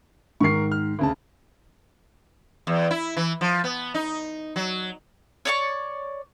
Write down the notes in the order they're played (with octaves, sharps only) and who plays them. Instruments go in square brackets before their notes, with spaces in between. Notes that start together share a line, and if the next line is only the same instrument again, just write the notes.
[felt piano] G#2 D#3 C7 [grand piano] A#4 C#6
[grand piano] F6
D2 C#3 A5
[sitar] E2
E4
E3
F3
B3
D#4
F#3
[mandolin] C#5 D5 C#6